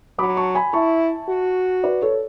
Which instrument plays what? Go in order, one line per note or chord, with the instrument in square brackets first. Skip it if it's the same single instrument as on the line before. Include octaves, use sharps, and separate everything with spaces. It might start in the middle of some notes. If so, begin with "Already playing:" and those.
[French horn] F#3 [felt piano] B5 D6
[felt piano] A5 C#6
G#5 B5
[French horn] E4 [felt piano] A5 C#6
[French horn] F#4
[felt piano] B4 D5
A4 C#5